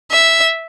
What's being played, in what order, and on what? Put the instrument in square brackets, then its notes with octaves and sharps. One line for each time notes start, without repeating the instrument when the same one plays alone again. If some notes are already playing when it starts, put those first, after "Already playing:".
[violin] E5